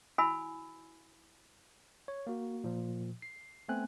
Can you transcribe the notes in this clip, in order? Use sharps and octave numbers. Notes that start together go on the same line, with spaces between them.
E4 F#4 G#5 B5 E6
C#5
A#3 F#4
A#2 F3
C7
A3 B3 C4 G#5 F#6